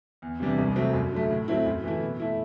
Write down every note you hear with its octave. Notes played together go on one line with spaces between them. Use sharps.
E2
C3 E3 G3 D4
C2
C3 F#3 A3 C4
F#2
D3 F#3 A3
A2
F#3 A3 C4 E4
F#2
E3 A3 E4
B2
A3 E4